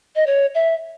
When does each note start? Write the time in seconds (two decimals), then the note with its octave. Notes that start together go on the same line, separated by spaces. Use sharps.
0.15 D#5
0.26 C#5
0.54 E5